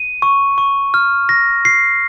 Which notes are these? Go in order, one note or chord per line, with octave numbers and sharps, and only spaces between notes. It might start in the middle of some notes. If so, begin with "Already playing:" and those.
Already playing: D#7
C#6
C#6
F6
A#6
C7